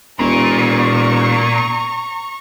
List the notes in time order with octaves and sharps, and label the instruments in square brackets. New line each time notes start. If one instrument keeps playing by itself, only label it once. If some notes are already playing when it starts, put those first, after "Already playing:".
[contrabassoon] E1 [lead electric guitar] A#2 [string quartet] A#5 C#6